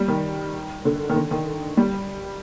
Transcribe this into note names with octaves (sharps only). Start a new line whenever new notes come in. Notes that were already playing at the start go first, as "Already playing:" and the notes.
Already playing: G3
D#3
D3
D#3
D3
D#3
G3